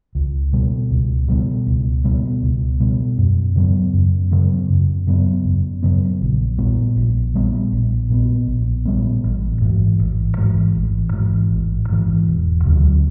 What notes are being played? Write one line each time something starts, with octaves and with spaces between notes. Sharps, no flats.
C#2
B2 G3 B3
C#2
B2 G3 B3
C#2
B2 G3 B3
C#2
B2 G3 B3
F#2
C#3 F#3 B3
F#2
C#3 F#3 B3
F#2
C#3 F#3 B3
F#2
C#3 F#3 B3
A#1
A#2 G3 B3
A#1
A#2 G3 B3
A#1
A#2 G3 B3
A#1
A#2 G3 B3
A1
G#2 E3
A1
G#2 E3
A1
G#2 E3
A1
G#2 E3
E1
D2 C#3 F#3